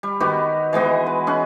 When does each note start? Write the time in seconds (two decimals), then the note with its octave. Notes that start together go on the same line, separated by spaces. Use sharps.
0.03 G3
0.20 D#3 B3 F#4 G4
0.73 E3 G#3 B3 D#5
1.06 B4
1.27 C#4 G#4 F#5